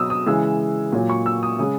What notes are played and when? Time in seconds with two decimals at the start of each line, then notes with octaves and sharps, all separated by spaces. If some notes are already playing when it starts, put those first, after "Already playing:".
Already playing: B2 F#3 D#6 E6
0.10 D#6
0.26 C#3 E3 G#3 E6
0.92 A#2 F#3
1.10 C#6
1.26 E6
1.43 D#6
1.59 C#3 G#3 D#6